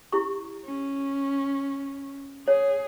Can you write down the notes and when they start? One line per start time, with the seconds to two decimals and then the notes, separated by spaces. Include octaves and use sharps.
0.12 E4 G4 C#6
0.65 C#4
2.48 G#4 C#5